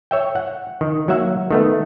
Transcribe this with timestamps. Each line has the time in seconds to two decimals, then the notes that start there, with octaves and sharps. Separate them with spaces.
0.11 C#5 E5 G5
0.36 F#5
0.81 D#3
1.08 F#3 A#3 E5 F#5
1.51 D#3 A3 B3